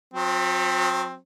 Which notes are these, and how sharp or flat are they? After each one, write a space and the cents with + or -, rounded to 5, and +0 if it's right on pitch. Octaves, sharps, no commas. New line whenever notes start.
F#3 -40 C4 +10